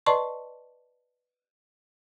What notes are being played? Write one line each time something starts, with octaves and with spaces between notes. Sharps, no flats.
B4 D5 D#5 A5 C6 C#6